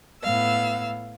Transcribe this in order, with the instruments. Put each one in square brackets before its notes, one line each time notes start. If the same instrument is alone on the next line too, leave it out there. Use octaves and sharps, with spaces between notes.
[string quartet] A2 B3 F5 E6